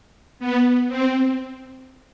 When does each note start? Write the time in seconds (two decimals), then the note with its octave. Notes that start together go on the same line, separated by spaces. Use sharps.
0.39 B3
0.89 C4